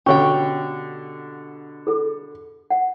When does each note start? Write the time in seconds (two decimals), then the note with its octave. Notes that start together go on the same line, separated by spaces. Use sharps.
0.06 B2 D3 C#4 G4 C#5 G5 C#6
1.87 G#4 A4
2.70 F#5